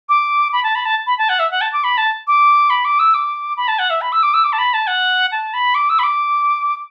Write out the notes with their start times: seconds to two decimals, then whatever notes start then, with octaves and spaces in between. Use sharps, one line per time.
0.09 D6
0.53 B5
0.64 A5
0.75 B5
0.85 A5
1.07 B5
1.18 A5
1.29 F#5
1.39 E5
1.51 F#5
1.61 A5
1.73 D6
1.84 B5
1.98 A5
2.27 D6
2.70 B5
2.85 D6
2.99 E6
3.14 D6
3.57 B5
3.68 A5
3.79 F#5
3.90 E5
4.01 B5
4.12 E6
4.23 D6
4.34 E6
4.44 D6
4.53 A5
4.59 B5
4.74 A5
4.87 F#5
5.32 A5
5.54 B5
5.75 D6
5.90 E6
5.99 B5
6.03 D6